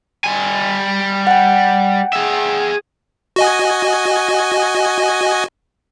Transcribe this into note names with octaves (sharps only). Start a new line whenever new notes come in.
G3 G#5
F#5 G5
G#4 E5
F#4 D#5 G#5